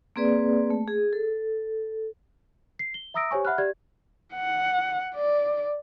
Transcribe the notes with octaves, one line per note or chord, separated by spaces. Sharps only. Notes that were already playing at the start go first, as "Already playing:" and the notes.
A#3 C4 G#4 B4 D5
A3
G#4
A4
C7
G7
E5 A#5 D#6 E6 A#6 D7
G4 C5 C#5 G#5 C#6
E5 F#5 B5 F6 F#6
G4 D5 G#6
F#5
D5